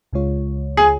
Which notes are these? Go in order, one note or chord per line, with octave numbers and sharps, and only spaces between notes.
C#2 C#3 G#3 F4 C#5
G#4